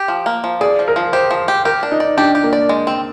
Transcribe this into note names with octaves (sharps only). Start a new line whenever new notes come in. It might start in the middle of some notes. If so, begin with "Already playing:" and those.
Already playing: G4
F3
A#3
F3
G#4 D5
F3
A#4
F3
G4 C5
F3
G4
G4 A#4
D4
D#4
D5
D4 G4
G4
A#3
D5
G#3
C4